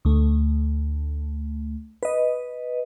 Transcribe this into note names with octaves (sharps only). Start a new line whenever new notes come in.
D2 A3
B4 D#5